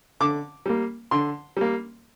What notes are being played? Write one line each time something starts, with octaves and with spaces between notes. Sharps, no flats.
D3 D6
G3 A#3
D3 C6
G3 A#3